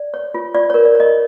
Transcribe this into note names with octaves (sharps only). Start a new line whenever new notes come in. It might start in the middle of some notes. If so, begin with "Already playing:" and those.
Already playing: D5
C#5
F4
F4 D5
A#4 C#5
D5
C#5 D#5